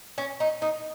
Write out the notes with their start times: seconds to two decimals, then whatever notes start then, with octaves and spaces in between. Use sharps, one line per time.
0.18 C#4
0.40 D#4
0.62 D#4